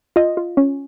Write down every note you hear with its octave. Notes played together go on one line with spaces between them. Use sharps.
F4 D#5
F4
C#4